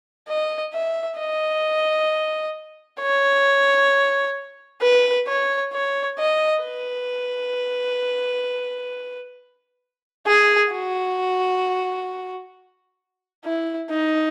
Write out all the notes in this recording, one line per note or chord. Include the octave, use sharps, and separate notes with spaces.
D#5
E5
D#5
C#5
B4
C#5
C#5
D#5
B4
G#4
F#4
E4
D#4